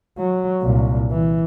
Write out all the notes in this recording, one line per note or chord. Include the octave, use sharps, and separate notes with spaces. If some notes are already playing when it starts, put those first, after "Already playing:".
F#3
C2 A#2
E3